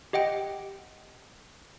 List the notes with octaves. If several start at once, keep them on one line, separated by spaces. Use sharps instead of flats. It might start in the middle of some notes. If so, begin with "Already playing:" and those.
G4 D#5 F#5 G5